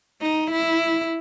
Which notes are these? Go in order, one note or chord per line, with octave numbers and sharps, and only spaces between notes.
D#4
E4